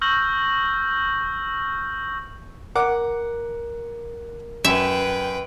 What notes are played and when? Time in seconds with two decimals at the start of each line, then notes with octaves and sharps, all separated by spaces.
0.01 C#6 E6 F6 G6 A#6 F#7
2.75 A#4 F#5 D6
4.65 F#2 B4 E5 G5